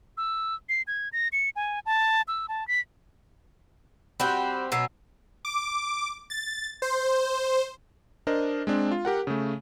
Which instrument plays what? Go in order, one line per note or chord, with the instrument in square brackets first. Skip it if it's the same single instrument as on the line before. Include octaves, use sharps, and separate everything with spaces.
[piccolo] E6
C7
G#6
A#6
C#7
G#5
A5
E6
A5
B6
[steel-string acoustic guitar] G3 [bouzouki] C4 F#4 G4 [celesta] F#5 B5
[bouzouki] B2 C#4 [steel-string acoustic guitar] F#3 [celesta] E6 C7
[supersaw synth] D6
A6
C5
[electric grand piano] D4 A#4 C5 D#5
G#3 C4 D4
F4
G4 A#4 F#5
C#3 A3